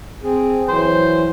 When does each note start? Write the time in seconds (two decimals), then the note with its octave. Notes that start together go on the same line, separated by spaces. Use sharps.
0.23 C4 G#4
0.69 E3 F#3 C5